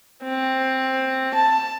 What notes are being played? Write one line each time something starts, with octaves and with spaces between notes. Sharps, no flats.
C4
A5